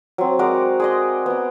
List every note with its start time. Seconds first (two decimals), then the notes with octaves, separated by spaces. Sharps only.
0.18 F#3 C4
0.39 G#3 F#4 A#4 D5
0.80 G#4 D5 D#5
1.26 B3 D5